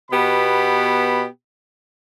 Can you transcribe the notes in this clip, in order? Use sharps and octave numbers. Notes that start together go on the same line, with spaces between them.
B2 B3 G4 B5